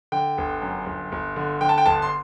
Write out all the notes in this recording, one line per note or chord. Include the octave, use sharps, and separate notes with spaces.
D3 G5
G1
F#2
G1
G1
D3
D3 G5
A5
G5
G1 A5
C6